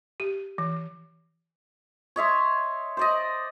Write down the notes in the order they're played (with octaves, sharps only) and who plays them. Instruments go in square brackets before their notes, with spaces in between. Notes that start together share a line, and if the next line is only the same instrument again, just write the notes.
[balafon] G4
E3
[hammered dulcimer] C#5 D#5 E5 C6
C5 D5 D#5